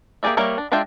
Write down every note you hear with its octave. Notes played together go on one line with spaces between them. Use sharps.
A#3 G4 G#4 D5 E5
G3 A#3 A#4 C#5 E5
D4
G#3 D4 F4 E5 G5